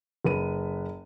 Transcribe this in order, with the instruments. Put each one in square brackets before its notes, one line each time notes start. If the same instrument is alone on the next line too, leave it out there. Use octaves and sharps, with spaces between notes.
[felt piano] F#1 B4 D#7